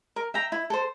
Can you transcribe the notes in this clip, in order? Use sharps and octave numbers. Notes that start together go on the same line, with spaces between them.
A#4
E5 G5 A#5
E4
A4 C5